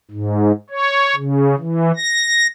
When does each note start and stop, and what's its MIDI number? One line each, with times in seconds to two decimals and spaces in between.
0.11 0.52 44
0.70 1.15 73
1.16 1.55 49
1.58 1.91 52
1.96 2.47 94